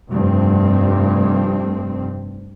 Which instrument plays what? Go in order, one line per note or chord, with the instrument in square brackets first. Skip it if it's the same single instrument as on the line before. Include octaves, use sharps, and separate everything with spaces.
[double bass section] F1 G2 C4